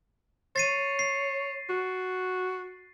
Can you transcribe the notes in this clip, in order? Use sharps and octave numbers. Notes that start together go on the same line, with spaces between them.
C#5 A6 C7 D#7
C7
F#4